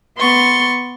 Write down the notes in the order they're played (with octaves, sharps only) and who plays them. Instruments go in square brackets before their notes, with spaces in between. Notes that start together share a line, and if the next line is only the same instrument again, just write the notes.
[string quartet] B3 C6 C#6 A6